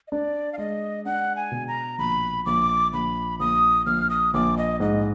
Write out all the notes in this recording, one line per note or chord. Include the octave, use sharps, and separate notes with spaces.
D#5
D4 D5
F5
G#3 D#5
D4 F#5
G#5
B2
A#5
A#1 B5
A#1 D6
A#1 B5
A#1 D#6
A#1 F6
D#6
A#1 D6
D#5
G#2 D#5